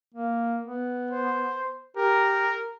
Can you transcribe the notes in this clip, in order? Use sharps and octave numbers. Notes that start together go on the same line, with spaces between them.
A#3
B3
C5
G4 A#4